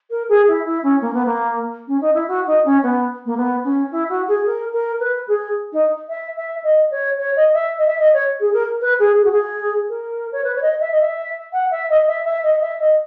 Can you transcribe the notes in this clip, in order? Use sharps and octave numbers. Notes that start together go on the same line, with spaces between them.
A#4
G#4
E4
E4
C#4
A#3
B3
A#3
C#4
D#4
E4
F#4
D#4
C#4
B3
A#3
B3
C#4
E4
F#4
G#4
A#4
A#4
B4
G#4
D#4
E5
E5
D#5
C#5
C#5
D#5
E5
D#5
E5
D#5
C#5
G#4
A#4
B4
G#4
G#4
F#4
G#4
A#4
C#5
B4
C#5
D#5
E5
D#5
E5
F#5
E5
D#5
E5
E5
D#5
E5
D#5